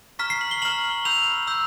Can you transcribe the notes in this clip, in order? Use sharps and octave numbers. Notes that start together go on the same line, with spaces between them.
A#5 C#6 F6 B6
C7
F#7
G7
A#5 C#6 F6 F#7
B5 E6 G6 F7
B5 E6 G6